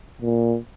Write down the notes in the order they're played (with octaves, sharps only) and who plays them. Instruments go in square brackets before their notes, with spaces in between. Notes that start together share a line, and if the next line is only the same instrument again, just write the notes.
[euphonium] A#2